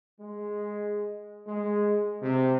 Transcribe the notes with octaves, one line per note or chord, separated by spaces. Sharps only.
G#3
G#3
C3